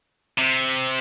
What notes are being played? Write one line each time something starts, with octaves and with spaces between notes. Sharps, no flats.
C3